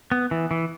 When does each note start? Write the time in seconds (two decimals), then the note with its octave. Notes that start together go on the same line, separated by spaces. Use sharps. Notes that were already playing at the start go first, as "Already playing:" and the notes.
0.12 B3
0.31 E3
0.51 E3